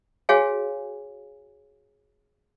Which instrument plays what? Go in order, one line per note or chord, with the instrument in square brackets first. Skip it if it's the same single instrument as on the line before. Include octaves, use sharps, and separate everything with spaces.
[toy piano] F#4 G#4 C#5 F5 G#5